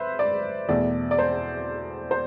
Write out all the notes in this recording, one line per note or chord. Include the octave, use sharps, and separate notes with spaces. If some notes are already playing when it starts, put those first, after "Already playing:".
Already playing: B4 C5 E5
D5
E2 B2 A3 D5
D5
C5
C5